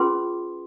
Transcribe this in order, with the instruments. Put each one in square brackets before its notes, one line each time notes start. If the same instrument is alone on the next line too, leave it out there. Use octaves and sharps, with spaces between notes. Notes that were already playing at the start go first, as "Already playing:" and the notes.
Already playing: [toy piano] C#4 F4 G#4 B4 C6